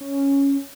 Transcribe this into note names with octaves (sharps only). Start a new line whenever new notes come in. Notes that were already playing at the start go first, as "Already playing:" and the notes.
C#4